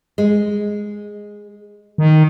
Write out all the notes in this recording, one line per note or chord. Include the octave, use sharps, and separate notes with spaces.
G#3
D#3